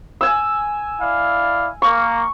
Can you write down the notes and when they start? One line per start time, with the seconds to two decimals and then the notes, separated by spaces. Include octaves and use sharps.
0.21 G#5 E6
1.00 E4 D5 F5
1.82 A#3 C#6